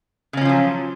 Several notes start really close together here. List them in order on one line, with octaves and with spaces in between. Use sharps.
C#3 C#4 F4 F3 F#3